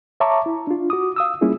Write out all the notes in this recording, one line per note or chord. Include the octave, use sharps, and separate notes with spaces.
C#5 E5 A5 A#5 C#6 D6
E4
D4 F4
F#4 D6 D#6
F5 D#6 E6
G3 A#3 C#4 E4 F4 G#4